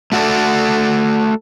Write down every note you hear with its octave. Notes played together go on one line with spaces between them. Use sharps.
A3 F#4 A4 D5